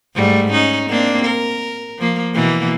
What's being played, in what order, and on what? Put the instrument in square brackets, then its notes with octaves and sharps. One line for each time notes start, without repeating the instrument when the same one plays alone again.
[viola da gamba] G#2 G3 A3
C#4 D#4
A#3 C4 D4
A#4
F3 A#3
B2 E3 A#3